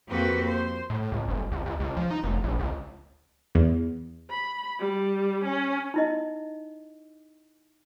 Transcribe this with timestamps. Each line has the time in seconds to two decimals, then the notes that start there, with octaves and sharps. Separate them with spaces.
0.10 F2 A#3 C4 F#4 G4 B4
0.45 C5
0.90 A2
1.12 C#2
1.28 G1
1.52 C#2
1.66 C#2
1.80 C#2
1.97 F3
2.11 D#4
2.23 F1
2.44 A#1
2.59 C#2
3.55 E2
4.30 B5
4.80 G3
5.45 C#4
5.94 D#4 E4 D#5